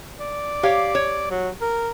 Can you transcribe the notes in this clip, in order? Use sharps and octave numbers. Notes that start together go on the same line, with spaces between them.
D5
G4 C#5 F5
C#5
F#3
A#4